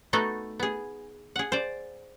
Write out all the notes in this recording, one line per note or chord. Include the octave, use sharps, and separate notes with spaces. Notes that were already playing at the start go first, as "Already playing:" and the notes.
A3 B3 D#4 F#4 A4
B3 G#4
G#4 F#5
C5 D5